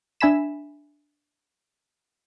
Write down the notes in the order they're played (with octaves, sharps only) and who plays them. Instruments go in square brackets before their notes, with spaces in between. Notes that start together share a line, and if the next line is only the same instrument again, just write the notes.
[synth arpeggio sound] D4 E5 G#5 B5 B6 E7